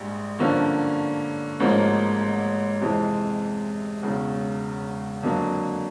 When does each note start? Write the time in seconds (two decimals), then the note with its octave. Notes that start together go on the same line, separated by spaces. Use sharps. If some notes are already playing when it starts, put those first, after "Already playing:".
Already playing: A#1 G#2 G3
0.39 G2 D3 F3 A#3 C#4
1.60 A1 G#2 F3 A#3
2.81 F2 C3 E3 G#3 C4
4.03 E1 E2 C#3
5.23 F2 D3 F#3 A#3